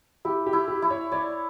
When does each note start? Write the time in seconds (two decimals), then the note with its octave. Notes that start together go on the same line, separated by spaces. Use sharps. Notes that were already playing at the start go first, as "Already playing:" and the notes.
0.25 E4 G4
0.46 G4
0.53 E4
0.68 G4
0.82 E4
0.90 C#5
1.12 C#5 D5